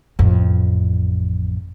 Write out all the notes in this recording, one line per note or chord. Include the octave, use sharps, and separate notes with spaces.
A1 F2